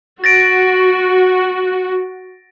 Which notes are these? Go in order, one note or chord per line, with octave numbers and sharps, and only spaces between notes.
F#4 A6 A#6 D7